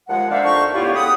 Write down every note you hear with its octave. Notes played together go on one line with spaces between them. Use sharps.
D#2 F3 G#3 F#5
A#3 D4 C5 D5 E5 F5
F2 D4 D#4 F5 C#6
A2 D3 B3 E4 F4 G4
C#3 G4 F#5 B5 D#6